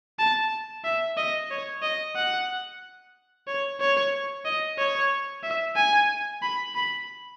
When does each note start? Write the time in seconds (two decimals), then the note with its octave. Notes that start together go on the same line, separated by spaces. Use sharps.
0.19 A5
0.84 E5
1.17 D#5
1.50 C#5
1.82 D#5
2.16 F#5
3.47 C#5
3.80 C#5
4.45 D#5
4.78 C#5
5.43 E5
5.76 G#5
6.42 B5
6.75 B5